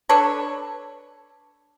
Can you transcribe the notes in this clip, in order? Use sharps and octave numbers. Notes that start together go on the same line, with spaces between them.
D4 A4 B4 C#5